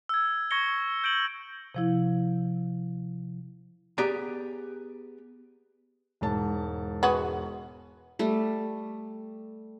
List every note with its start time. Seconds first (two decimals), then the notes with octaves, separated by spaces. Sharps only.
0.09 E6 G#6
0.51 C#6 G#6 A#6 C#7 G7
1.04 G6 D7 F#7
1.75 C3 F3 E4
3.98 B3 G4 G#4 D5 A#5
6.21 E1 G#2 A5
7.03 G#3 B3 F#4
8.19 G3 A3